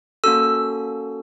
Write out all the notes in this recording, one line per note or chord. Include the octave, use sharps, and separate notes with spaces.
A#3 C#4 F#4 A4 E6